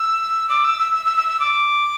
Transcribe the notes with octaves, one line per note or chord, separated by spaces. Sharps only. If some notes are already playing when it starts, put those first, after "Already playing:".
Already playing: E6
D6
E6
E6
E6
E6
E6
E6
D6